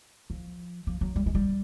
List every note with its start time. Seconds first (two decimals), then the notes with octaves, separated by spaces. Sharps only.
0.30 F3
0.87 F3
1.01 F#3
1.16 G3
1.26 G#3
1.35 G3